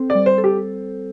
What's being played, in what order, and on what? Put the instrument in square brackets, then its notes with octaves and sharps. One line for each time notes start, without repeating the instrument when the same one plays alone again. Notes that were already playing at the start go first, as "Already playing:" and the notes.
Already playing: [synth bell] C4 A4 C5
[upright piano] D5
[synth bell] G3
[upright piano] C5
[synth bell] A4
[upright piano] G4